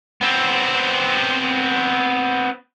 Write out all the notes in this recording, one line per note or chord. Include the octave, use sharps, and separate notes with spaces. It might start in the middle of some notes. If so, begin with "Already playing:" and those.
B3 C4